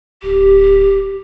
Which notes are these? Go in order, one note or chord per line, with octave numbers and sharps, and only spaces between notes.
D1 G4